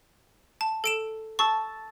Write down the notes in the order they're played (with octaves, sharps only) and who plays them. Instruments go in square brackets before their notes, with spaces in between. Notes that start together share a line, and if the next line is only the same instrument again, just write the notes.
[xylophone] A5
A4 D7 E7
[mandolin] A5 E6 [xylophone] C#6